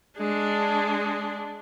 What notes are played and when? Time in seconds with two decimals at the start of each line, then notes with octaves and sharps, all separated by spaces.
0.17 G#3 D4